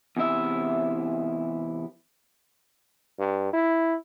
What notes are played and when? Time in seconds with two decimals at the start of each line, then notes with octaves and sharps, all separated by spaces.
0.17 E2 C3 E4 E5
3.19 G2
3.53 E4